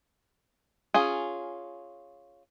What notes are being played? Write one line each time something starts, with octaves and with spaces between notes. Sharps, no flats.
C#4 F4 G#4